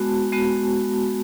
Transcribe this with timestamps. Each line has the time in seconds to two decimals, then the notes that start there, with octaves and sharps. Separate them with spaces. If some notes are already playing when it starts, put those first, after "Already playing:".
Already playing: G#3 B3 F#4 A5
0.32 G#3 B3 F#4